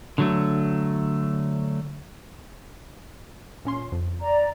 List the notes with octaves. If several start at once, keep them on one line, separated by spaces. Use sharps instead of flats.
D3 F#3 A3
A#2 C#4 C6
F2
D5 A#5